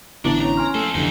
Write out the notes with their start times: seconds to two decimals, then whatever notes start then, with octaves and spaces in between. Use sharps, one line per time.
0.25 A1 D3 B3 D4 E4 D6
0.40 C#4 C#5 A#5
0.57 G#5 C6 F6
0.75 F2 A3 A4
0.95 F1 E2 D3 E3 D#4